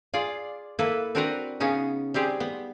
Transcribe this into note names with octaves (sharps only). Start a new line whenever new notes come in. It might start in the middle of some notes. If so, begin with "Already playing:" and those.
F4 G#4 D5
A#3 E4 A4 B4
C4 D4 F#4 A#4 B4 A#5
C#3 B3 C#4 D#4
G3 C4 G4 G#4
B3